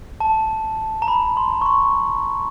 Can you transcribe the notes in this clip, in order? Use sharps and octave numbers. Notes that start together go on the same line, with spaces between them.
A5
A#5
B5
C6
C#6
C6